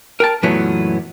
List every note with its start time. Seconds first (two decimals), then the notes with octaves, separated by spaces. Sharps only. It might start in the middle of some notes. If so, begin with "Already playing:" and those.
0.20 A#4 G5 A5
0.43 F#2 A#2 E3 F#3 A3 B3